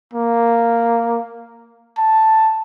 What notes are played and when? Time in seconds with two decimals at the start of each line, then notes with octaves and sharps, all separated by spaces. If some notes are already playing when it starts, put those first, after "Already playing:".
0.14 A#3
1.98 A5